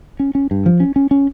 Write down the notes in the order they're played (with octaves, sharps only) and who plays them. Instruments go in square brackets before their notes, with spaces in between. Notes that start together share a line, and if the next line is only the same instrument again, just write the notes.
[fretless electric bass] C#4
C#4
G2
F3
C#4
C#4
C#4